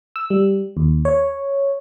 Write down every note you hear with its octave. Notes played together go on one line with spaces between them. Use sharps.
E6
G3
D#2
C#5